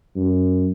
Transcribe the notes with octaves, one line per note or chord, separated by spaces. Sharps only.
F#2